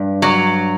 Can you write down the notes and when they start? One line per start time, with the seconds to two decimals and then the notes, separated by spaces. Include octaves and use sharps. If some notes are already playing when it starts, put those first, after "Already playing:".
Already playing: G2
0.22 F#3